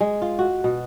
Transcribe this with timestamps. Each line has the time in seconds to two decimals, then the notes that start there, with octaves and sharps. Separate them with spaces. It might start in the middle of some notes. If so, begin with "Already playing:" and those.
0.01 G#3
0.22 F4
0.39 F#4
0.64 B2